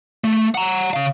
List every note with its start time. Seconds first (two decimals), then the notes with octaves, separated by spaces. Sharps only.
0.24 A3
0.55 F#5 A#5
0.93 C#3 F5